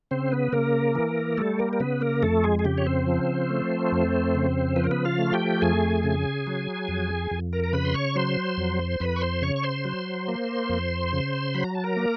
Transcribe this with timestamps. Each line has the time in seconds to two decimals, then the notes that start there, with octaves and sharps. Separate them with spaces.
0.11 C#3 C4 C5
0.32 B3 B4
0.53 C#3 A#3 A#4
0.95 E3
1.37 G3 A3 A4
1.59 A#3 A#4
1.73 A#4
1.80 C#3 B3 B4
2.01 A#3 A#4
2.23 F2 A3 A4
2.44 G#3 G#4
2.59 G#4
2.65 C#3 G4
2.78 C#5
2.86 C4 C5
3.07 F3
3.50 A3
3.92 F2
4.35 C#3
4.76 F3 B4
4.84 A#4
4.91 B3 B4
5.05 F4 F5
5.19 A3
5.33 G4 G5
5.61 F2 G#4 G#5
6.04 C#3
6.47 F#3
6.88 F2
7.31 F2
7.53 A#4 A#5
7.64 A#5
7.73 C#3 B4 B5
7.85 C6
7.94 C#5 C#6
8.16 F#3 C5 C6
8.58 F2
9.00 F2 B4 B5
9.16 C#6
9.21 C5 C6
9.42 C#3 C#5 C#6
9.56 C#6
9.64 C5 C6
9.85 F#3
10.28 A#3
10.70 F2
11.13 C#3
11.54 F#3 B5
11.64 A#5
11.75 A5
11.84 A#4 A#5
11.96 A#3